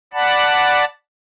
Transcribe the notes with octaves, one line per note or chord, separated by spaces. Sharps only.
D5 F#5 A5 B5